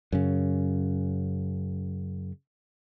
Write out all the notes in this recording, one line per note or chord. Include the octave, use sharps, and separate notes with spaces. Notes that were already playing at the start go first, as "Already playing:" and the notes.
F#2 C#3